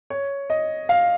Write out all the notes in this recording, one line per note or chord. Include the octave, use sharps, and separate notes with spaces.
C#5
D#5
F5